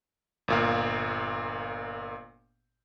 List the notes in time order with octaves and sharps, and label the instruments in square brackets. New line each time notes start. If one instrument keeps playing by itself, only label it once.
[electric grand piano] G1 A#2 F5